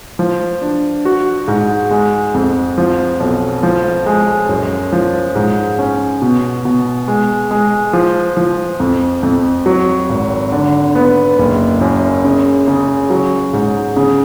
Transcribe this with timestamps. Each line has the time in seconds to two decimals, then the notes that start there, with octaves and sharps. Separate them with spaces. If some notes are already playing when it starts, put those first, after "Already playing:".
0.19 F3
0.61 D4
1.05 F#4
1.48 G#2
1.91 G#3
2.34 F2
2.78 F3
3.20 B1
3.63 F3
4.06 G#3
4.49 F#2
4.92 F3
5.36 G#2
5.79 C#4
6.22 B2
6.65 B2
7.08 G#3
7.51 G#3
7.93 F3
8.37 F3
8.80 F2
9.23 F2
9.66 F#3
10.10 G#1
10.52 D3
10.95 B3
11.39 F#1
11.81 F#2
12.25 C#3
12.68 C#3
13.10 F#3
13.53 G#2
13.97 C#3